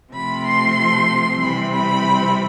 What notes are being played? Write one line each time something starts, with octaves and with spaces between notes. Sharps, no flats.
C3 F3 A3 C4 B5
C6
C3 E3 G3 C4 B5
B5